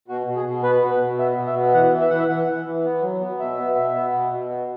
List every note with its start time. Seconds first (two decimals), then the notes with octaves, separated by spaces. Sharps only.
0.08 B2 F#4
0.27 B2
0.36 G#4
0.45 B2
0.63 B3 B4
0.81 B2
0.91 B4
1.00 B2
1.18 B3 E5
1.37 B2
1.46 E5
1.55 B3
1.74 E3 F#5
1.92 E3
2.01 E5
2.10 E3 F#5
2.19 E5
2.29 E3 F#5
2.47 E3
2.65 E3
2.84 B3
3.02 F#3
3.20 B3
3.39 B2 E5
3.57 B3
3.76 B2
3.94 B3
4.13 B2
4.30 B2
4.49 B3